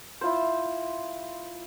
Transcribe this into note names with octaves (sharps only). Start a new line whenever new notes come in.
E4 F4 C5